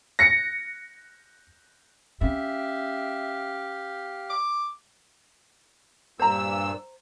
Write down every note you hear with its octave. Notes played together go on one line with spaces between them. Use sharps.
A#6 C#7
C#4 G4 E5 F5
D6
G2 A#2 C5 A#5 E6